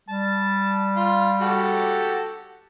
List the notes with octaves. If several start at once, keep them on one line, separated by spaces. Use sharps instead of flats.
G3 A5
F4
F#4 G4 A4